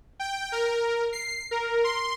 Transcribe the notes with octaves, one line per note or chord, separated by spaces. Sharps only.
G5
A#4
C7
A#4
C6